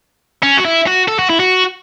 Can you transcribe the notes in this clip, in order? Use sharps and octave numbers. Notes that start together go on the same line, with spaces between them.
C#4
F#4
E4
F#4
A4
F#4
E4
F#4